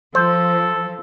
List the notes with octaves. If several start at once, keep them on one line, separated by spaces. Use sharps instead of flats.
F3 A4 C5